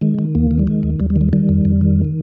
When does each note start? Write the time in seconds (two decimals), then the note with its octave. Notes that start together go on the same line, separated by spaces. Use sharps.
0.01 D#3 G#3
0.19 D#3
0.35 D#2 A#3
0.51 D#3
0.59 G3
0.67 D#3 G#3
0.83 D#2
1.00 D#2 G3
1.10 G3
1.16 D#3
1.21 G3
1.33 D#3 G3
1.49 F2
1.65 F2
1.81 D#3